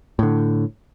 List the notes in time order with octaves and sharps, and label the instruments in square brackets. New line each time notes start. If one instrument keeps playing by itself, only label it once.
[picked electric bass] A2 D3